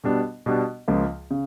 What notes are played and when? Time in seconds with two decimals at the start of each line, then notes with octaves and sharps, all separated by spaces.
0.04 B2 G3 B3 D4
0.46 B2 G3 B3 D4
0.88 C#2 C#3 F3 A#3
1.31 C#3